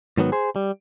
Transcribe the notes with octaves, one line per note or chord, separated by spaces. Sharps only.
G#2 D#3 F#3 B3
G#4 C5
G3